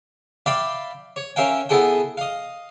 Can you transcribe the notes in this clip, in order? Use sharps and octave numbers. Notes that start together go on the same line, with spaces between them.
D5 E5 F5 G5 B5
C#5
C#4 A#4 E5 F5 G5
B3 E4 G#4 A4 G5
D#5 F5